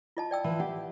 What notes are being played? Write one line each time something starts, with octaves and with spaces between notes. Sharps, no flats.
F4 D#5 A5
D5 G5 E6
E3 F3
G4 F#5